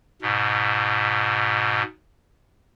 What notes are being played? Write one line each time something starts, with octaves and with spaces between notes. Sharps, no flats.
G#2 B2